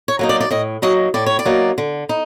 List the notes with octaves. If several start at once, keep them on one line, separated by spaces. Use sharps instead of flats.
C#5
F#3 A#3 D#4
D5
D5
A2 D#5
F#3 A#3 D#4 D#5
A2 D5
C#5
D5
F#3 A#3 D#4
D3
D#4